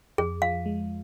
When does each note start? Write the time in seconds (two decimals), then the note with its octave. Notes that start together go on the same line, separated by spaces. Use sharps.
0.18 F2 G#4
0.42 F3 F5
0.66 G#3